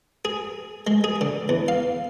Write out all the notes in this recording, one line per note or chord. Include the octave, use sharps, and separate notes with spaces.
G#4
G#3
G#4
D3
E2
F5